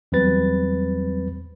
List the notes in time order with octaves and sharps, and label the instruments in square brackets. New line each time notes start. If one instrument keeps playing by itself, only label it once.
[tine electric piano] E2 F#3 G3 C4 B4 A6